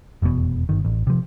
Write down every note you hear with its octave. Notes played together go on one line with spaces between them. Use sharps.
F1 E2 G2 B2
G1 D#3
A1
C3 F3